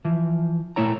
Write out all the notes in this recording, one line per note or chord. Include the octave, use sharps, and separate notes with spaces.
E3 F3
A#2 A3 E4 C#5 A#5